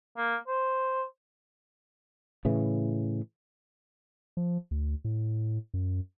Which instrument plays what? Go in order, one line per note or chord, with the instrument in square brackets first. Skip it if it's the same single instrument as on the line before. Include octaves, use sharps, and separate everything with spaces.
[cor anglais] A#3
C5
[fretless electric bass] A2 C#3 E3
[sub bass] F3
D2
A2
F#2